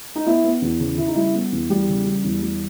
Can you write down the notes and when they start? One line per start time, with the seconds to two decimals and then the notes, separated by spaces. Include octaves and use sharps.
0.15 D#4
0.26 B3 E4
0.44 B3
0.62 E2
0.80 C#3
0.98 C#3 E4
1.07 D#4
1.15 G3 E4
1.35 B3
1.52 E2
1.70 E2 G3 G4
1.88 C#3
2.06 G3
2.24 E2
2.42 G3